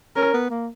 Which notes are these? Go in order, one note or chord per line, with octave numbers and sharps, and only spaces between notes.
C#4 A#4
B3
A#3